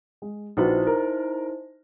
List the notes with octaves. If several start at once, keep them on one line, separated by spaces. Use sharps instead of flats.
G#3
A#1 D#4 E4 F#4 B4 C5
A#4